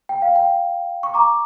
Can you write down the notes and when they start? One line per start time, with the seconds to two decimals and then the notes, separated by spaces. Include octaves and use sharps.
0.09 G5
0.22 F5
0.36 G5
1.03 C#6
1.14 A#5 D6